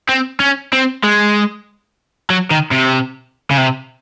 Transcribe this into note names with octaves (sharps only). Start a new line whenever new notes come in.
C4
C#4
C4
G#3
F#3
D#3
C3
C#3
C3